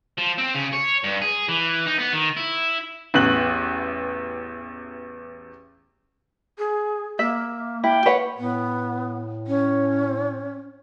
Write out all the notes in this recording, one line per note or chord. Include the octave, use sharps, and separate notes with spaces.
F3
C4
C#3
C#5
G2
G#4
E3
D#4
B3
D#3
E4
A1 E2 F#6 F#7
G#4
A#3 E5
E4 G5
B4 C#5 F#5
A2 B3
C#4